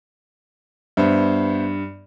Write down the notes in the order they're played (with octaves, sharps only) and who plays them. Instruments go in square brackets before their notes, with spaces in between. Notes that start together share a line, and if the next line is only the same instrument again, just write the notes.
[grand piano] G2 [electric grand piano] B3 C5 E5